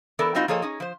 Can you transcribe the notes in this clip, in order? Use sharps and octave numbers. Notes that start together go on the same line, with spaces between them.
E3 B3 A4 A#4 D5
G3 C4 D#4 F4 F#4
F3 A#3 G#4 A4 C#5 D#5
C#4 D#4 G#4
F3 C5